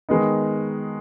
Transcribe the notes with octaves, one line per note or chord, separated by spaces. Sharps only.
D#3 G#3 B3 D#4